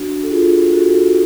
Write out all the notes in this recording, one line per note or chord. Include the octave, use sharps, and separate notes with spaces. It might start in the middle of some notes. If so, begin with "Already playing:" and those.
Already playing: D4 F#4
A4
F4 G#4
F#4 A4